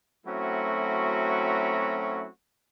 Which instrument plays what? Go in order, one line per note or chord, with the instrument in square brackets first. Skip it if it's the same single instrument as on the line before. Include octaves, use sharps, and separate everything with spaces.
[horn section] F#3 A3 C4 C#4 E4 F#4